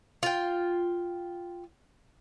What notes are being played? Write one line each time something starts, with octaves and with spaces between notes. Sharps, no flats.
F4 G5